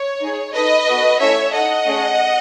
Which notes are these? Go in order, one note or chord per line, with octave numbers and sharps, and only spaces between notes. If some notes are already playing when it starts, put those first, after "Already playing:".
Already playing: C#5
D#4 G#4
D#4 A4 B4 D#5
B3 F#4 A4
A3 C#4 E4 A4 C#5 E5
D#4 A4 D#5 F#5
A3 C#4 G#4